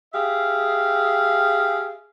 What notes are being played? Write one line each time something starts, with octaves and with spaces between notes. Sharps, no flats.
G4 G#4 E5 F5